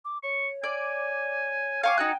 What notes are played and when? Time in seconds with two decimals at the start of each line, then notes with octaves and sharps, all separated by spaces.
0.05 D6
0.23 C#5 C#6
0.63 D5 G#5
1.83 F5 G#5 C#6 D6
1.98 D#4 F#4 G5 F#6